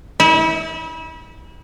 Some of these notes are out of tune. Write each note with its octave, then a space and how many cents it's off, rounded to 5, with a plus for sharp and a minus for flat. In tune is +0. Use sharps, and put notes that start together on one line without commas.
E4 -35